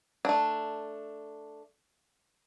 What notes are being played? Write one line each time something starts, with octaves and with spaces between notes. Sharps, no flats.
A3 D4